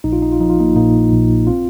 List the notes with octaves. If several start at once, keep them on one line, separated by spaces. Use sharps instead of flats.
A#1 D#4
F4
D#4
F4
F3 D#4
F4
A#3 D#4
A#2 A#3 D#4
A#1
C4 F4